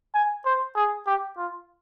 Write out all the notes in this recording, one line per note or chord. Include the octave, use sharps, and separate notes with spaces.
G#5
C5
G#4
G4
F4